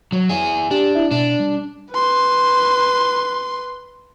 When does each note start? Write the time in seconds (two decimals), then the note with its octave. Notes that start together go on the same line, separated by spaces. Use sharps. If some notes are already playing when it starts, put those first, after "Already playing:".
0.12 F#3
0.30 E4 G#4
0.71 D4 G4
0.95 E4 E5
1.11 B2 D4
1.40 G3
1.91 B4 C6